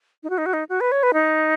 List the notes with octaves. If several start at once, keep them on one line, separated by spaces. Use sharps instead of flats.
D#4
F#4
D#4
F#4
D#4
F#4
B4
C#5
B4
D#4